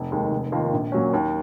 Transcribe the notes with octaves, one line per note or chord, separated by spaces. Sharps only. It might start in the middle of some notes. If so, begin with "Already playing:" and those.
Already playing: F1
D#2 D#3 G#3
F1
D#2 D#3 A#3 F4
A#1
A#2 F#3 C#4
D#2